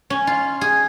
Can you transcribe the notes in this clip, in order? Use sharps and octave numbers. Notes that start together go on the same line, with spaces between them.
C#4
F4
G#4